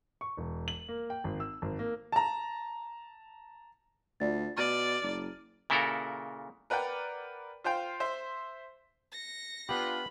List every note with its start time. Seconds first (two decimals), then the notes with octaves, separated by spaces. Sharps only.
0.21 C#6
0.37 E1
0.68 F#7
0.89 A#3
1.10 G5
1.24 G#1
1.40 E6
1.62 G#1
1.79 A#3
2.12 A5 A#5
4.20 D2 F4 D5 A6
4.57 B2 D5 F6 A6 D#7
5.03 F#1
5.70 A#2 C#3 E4 F#4 A4 A#4
6.70 A#4 B4 D5 F#5 G5
7.64 F4 C5 F5 G5
8.00 C5 E5
9.12 A#6 C#7
9.69 B3 D4 F4 G4 B5